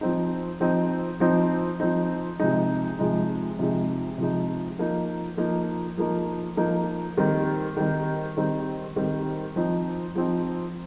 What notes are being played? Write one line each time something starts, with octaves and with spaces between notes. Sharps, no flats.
F3 C4 D#4
F3 C4 D#4
F3 C4 D#4
F3 C4 D#4
C3 F3 G#3 D#4
C3 F3 G#3 D#4
C3 F3 G#3 D#4
C3 F3 G#3 D#4
F3 A#3 D#4
F3 A#3 D#4
F3 A#3 D#4
F3 A#3 D#4
D#3 G3 C4 D#4
D#3 G3 C4 D#4
D#3 G3 C4 D#4
D#3 G3 C4 D#4
F3 C4 D#4
F3 C4 D#4